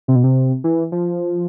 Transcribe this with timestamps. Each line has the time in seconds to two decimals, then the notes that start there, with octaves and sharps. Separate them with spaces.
0.08 C3
0.15 B2
0.24 C3
0.64 E3
0.92 F3